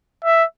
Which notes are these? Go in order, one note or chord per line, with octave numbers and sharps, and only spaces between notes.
E5